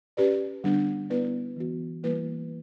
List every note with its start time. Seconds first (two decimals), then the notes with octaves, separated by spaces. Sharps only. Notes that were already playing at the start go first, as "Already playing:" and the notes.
0.17 C#4 G4 B4 D5
0.64 D3 G3 B3 D4
1.10 B3 E4 B4 D5
1.56 E3 B3 F#4
2.03 E3 G3 A#3 E4 B4